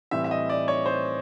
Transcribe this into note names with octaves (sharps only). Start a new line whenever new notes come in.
A2 E3 G3 C4 E5
E5
D#5
D5
C#5
C5